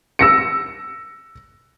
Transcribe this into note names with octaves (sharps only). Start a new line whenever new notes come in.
E6 A#6 C#7